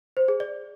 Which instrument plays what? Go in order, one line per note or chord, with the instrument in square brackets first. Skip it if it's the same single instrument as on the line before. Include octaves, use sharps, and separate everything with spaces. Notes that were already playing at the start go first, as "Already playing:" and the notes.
[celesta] C5
G#4
D5